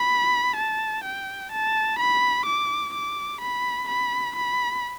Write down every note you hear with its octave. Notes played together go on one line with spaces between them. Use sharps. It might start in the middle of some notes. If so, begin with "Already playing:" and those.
Already playing: B5
A5
G5
A5
B5
D6
D6
B5
B5
B5